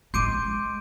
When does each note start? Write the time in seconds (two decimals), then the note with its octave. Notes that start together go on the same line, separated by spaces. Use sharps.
0.14 G#3 C#4 C6 D6 G6 D7 D#7